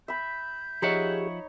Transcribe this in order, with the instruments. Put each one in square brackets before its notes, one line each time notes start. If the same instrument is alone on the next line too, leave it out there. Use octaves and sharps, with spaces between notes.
[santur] E5 B5 [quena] G6
[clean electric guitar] F3 E5 F#5 [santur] D#4 C#5 C#6 [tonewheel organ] G4 G#4